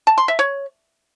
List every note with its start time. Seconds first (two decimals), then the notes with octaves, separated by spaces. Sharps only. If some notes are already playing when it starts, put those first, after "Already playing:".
0.07 A5
0.18 C6
0.28 E5
0.39 C#5